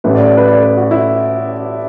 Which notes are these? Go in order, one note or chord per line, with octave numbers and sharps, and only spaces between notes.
A1 A2 A3 B4
D5
D5
B4
D5
B4
F#4
E4